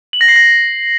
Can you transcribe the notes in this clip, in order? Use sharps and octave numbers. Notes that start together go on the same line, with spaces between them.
F#7
A#6
C7
A#6